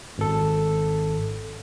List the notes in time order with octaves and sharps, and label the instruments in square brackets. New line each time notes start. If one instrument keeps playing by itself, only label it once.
[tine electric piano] G#1 A4